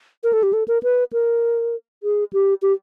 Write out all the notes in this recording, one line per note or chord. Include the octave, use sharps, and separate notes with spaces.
A#4
A4
G4
A4
A#4
B4
A#4
G#4
G4
G4